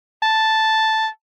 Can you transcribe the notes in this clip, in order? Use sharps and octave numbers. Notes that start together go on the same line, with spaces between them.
A5